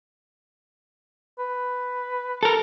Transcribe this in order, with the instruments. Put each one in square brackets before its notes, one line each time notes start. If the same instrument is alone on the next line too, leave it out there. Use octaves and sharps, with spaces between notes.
[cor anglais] B4
[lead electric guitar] A4 A#4